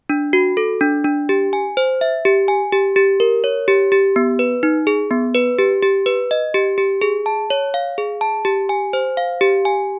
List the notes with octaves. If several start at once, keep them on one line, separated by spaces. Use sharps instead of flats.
D4
F#4
A4
D4
D4
G4
G#5
C5
E5
G4
G#5
G4
G4
A#4
C#5
G4
G4
B3
B4
D#4
G#4
B3
B4
G4
G4
B4
D#5
G4
G4
G#4
A5
C#5
F5
G#4
A5
G4
G#5
C5
F5
G4
G#5